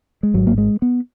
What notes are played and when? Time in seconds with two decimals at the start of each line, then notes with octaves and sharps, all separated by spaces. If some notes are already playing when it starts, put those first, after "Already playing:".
0.23 G#3
0.34 G#1 G#2 F#3
0.47 A#3
0.58 G#3
0.82 B3